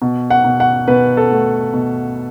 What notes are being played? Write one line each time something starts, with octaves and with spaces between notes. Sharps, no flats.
B2
F#5
B2
F#5
B2 B4
A4
A3
B2